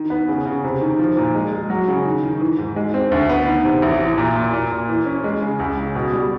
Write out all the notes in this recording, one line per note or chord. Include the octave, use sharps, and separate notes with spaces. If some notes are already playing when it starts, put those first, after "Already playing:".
Already playing: D#3
B3
C#3
C#3
C3
D#3
F3
A#2
G#3
G#3
F#3
C#3
D#3
D#3
E3
G#2
G#3
C4
D2
B3
D#3
C3
A1
E3
A#2
A#2
A#2
A#2
E3
C#4
G#3
C#3
C#2
C#3
B2
G3